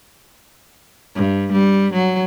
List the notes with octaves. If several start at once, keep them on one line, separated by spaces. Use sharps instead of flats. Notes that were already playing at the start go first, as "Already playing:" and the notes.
G2
G3
F#3